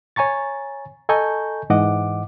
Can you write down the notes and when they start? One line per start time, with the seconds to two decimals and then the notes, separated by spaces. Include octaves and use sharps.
0.16 C#5 G#5 A#5 C#6 A6
1.09 A4 D#5 G#5 A#5 C#6 G6
1.70 G#2 E3 D#5 F#5 D6